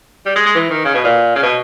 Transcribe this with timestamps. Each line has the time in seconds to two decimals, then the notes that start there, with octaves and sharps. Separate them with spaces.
0.26 G3
0.36 G#3
0.46 G#3
0.56 E3
0.70 D#3
0.85 C#3
0.94 B2
1.04 A#2
1.36 C#3
1.43 B2